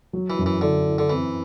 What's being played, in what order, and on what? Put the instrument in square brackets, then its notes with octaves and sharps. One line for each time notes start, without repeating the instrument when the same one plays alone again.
[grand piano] F#3
[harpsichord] E3
[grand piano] F#2
[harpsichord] E3
[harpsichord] D3 [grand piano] E4
[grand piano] E4
[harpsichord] D3
[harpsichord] E3 [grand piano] C4